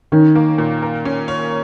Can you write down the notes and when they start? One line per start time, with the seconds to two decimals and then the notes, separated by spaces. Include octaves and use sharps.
0.12 D#3 C#4
0.35 A#3
0.58 A#2
0.82 A#4
1.05 C#4
1.28 C#5